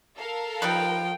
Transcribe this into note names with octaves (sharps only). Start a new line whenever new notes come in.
A4 A#4 F5
F3 G3 D#4 B4 G5